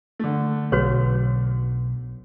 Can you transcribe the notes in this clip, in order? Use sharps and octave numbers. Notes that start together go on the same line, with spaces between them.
D3 A3
B1 F#4 B4 C#5